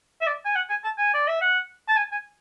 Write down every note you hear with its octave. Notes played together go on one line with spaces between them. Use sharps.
E5
D5
G#5
F#5
G#5
A5
G#5
D5
E5
F#5
A5
G#5
G#5